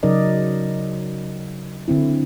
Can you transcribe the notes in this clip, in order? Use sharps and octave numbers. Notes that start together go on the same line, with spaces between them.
C#3 F#3 D#4 A#4 D5 D#5
D3 C4 E4